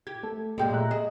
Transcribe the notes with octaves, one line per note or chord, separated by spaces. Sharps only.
G4 G#6
A3 A4
F#2 A#2 G#3 A3 G4 G5
E5 A#5 F#6
G#4 D#5